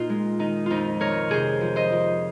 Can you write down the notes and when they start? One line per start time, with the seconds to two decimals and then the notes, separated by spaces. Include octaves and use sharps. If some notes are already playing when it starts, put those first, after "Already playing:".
Already playing: A#2 D#4 F4
0.09 G#3
0.39 D#3 D#4
0.66 F2 D#4 F4
1.00 D#3 A#4 C#5
1.29 C3 G#4 C5
1.61 F3
1.76 C5 D#5
1.92 F3